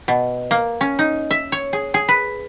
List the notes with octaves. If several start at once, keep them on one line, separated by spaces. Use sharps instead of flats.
B2
A#3
C#4
D#4
E5
C#5
G#4
G#4
B4